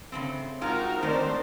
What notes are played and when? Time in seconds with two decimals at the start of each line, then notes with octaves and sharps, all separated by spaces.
0.12 C#3 A3 C4
0.61 G#3 C4 D#4 F4 F#4 A#4 A#5
1.02 D#3 G#3 A3 C4 D#4 A#4 C5 D5